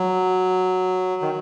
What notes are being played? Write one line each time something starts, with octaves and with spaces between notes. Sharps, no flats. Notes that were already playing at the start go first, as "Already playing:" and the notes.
Already playing: F#3
D#3